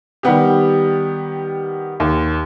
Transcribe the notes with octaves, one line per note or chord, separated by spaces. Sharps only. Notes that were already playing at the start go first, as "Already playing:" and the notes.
D#3 G3 B3 G4
D#2